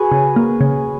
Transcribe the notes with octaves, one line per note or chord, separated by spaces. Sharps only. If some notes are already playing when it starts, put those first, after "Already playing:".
Already playing: F#4 G#4 B4
C#3
A#3
C#3